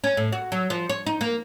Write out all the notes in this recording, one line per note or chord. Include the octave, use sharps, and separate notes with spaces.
C#4
A2
F#4
F#3
F3
C#5
D#4
A#3